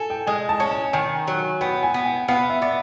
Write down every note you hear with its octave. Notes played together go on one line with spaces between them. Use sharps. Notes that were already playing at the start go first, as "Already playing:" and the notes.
Already playing: A4 G#5
G5
G#3 G#5
A5
C#4
A5
D#3 G#5
F#3
B3 G5
G#5
B3
G5
B3 F5
E5
B3 D5